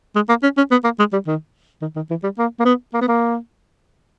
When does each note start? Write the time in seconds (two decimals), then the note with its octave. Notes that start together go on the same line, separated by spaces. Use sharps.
0.15 G#3
0.29 A#3
0.43 C#4
0.57 C#4
0.71 B3
0.84 A#3
0.99 G#3
1.13 G3
1.27 D#3
1.82 D#3
1.96 D#3
2.10 E3
2.23 G3
2.38 A#3
2.60 A#3
2.65 B3
2.93 A#3
3.01 B3
3.08 A#3